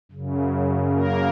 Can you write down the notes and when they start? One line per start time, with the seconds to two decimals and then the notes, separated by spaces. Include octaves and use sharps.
0.12 F#2 C#3
0.92 A#3 A#4